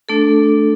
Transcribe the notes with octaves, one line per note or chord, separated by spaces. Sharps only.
A3 D4 A4